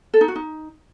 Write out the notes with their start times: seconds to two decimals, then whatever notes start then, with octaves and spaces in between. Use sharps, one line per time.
0.14 A4
0.21 D#4
0.28 F#4
0.36 D#4